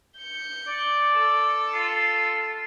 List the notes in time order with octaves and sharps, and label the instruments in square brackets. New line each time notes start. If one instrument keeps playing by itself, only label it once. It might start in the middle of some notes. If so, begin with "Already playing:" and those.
[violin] G6 C#7
[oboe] D5
[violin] A4
[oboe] F4